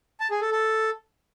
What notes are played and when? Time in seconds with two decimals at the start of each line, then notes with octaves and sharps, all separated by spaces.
0.20 A5
0.31 G#4
0.41 A4
0.51 A4